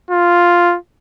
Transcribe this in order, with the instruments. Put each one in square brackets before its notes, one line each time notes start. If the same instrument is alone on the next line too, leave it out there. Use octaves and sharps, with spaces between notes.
[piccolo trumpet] F4